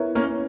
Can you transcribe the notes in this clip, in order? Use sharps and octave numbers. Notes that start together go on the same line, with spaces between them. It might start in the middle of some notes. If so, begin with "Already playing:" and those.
Already playing: B3 E4 A#4 C#5
A#3 C#4